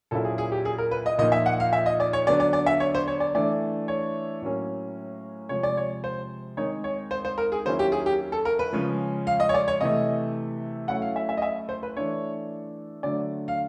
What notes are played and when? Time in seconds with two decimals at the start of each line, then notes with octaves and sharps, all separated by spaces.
0.11 A#2 F#3 A#3 C#4 E4 A4
0.25 G#4
0.38 G#4
0.52 G4
0.65 G#4
0.78 A#4
0.91 B4
1.06 D#5
1.18 A#2 F3 A#3 D#4 D#5
1.32 E5
1.46 F#5
1.60 F5
1.73 E5
1.86 D#5
2.00 D5
2.13 C#5
2.27 D3 F#3 B3 D4 D5
2.40 D5
2.53 D5
2.66 E5
2.80 C#5
2.95 C5
3.08 C#5
3.20 D5
3.35 E3 A3 D4 D5
3.88 C#5
4.42 A2 F#3 A#3 C#4
5.49 C3 F3 G#3 C#5
5.63 D5
5.77 C#5
6.04 C5
6.57 D#3 G#3 C4 D#4 C#5
6.84 C#5
7.11 C5
7.25 C5
7.38 A#4
7.52 G#4
7.65 D#3 F#3 A#3 C#4 E4 C5
7.79 G4
7.92 G#4
8.06 G4
8.32 A4
8.45 A#4
8.59 B4
8.73 C#3 F3 G#3 C#4
9.27 F5
9.40 D#5
9.49 C#5
9.54 D5
9.68 C#5
9.81 C3 E3 A3 D#5
10.88 F#3 A3 C#4 E4 F#5
11.02 F5
11.16 E5
11.29 E5
11.37 D#5
11.42 E5
11.69 C5
11.83 B4
11.97 E3 A3 D4 C#5
13.03 D3 F#3 A3 D5
13.48 F5